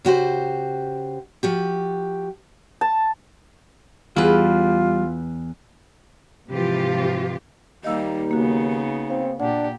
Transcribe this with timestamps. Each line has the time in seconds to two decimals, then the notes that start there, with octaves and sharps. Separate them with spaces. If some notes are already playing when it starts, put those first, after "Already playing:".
0.05 C#3 F#4 G4 C5
1.43 F3 F#4 G4
2.81 A5
4.16 E2 G3 F4 B4
6.51 G#2 C3 E3 F3 F4 G4
7.84 D#2 G3 A#3 D#4 D#5 F5 E6
8.31 C#3 A#3 B3 F#4
9.10 C4 F5
9.40 A#2 D4 G4 F#5